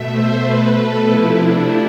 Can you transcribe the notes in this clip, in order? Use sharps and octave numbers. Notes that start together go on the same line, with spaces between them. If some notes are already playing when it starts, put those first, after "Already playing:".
Already playing: B2 A3 E5
C5
B2 A3 B4
A4
C3 F3 A3 E4
D4